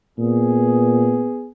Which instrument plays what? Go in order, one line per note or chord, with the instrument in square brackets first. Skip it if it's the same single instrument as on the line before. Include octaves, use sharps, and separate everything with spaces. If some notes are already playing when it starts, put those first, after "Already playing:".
[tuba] A#2 [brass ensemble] B3 G#4